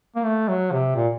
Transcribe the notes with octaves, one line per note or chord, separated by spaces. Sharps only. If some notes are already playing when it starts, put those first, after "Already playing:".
A#3
A3
F#3
C3
A#2